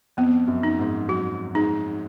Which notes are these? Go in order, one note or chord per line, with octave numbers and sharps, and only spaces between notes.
F2 B3
F#2
D#4
G#2
F#3 F#4
G#3 D#4